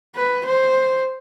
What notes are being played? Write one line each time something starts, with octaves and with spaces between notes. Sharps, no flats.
B4
C5